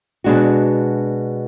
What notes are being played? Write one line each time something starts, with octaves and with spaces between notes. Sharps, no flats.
B2 G#3 D4 F#4